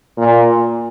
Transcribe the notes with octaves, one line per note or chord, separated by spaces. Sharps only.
A#2